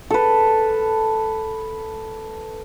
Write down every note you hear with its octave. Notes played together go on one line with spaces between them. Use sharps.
A4 B4